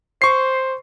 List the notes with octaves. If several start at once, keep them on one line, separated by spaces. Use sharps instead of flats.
C5 C#6 C7